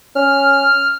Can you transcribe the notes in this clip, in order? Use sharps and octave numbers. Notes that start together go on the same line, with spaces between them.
C#4 F6